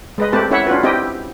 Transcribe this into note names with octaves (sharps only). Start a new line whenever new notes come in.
G#3 B4 D#5
A3 C4 G4 B4 A5
C#4 E4 C#5 E5 F#5
C#4 D4 F4 F#4 B4
C4 E4 G4 D#5 G5